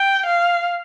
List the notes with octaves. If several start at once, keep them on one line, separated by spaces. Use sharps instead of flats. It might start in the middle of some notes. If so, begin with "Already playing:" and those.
Already playing: G5
F5